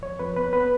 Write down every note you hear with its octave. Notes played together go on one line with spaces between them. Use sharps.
F2 C#5
F2 B4
B3 B4
B3 B4